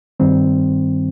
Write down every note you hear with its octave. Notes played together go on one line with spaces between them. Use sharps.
G2 D#3 G3 C4